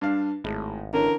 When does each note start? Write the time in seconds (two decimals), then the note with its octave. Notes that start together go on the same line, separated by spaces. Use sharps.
0.01 G2 D4 F5
0.44 G#1 A2 G#3
0.93 D3 E3 C#4 A#4